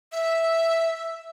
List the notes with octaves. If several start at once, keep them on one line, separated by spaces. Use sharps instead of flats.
E5